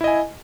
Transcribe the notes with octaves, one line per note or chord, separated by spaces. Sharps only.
E4 D#5 G#5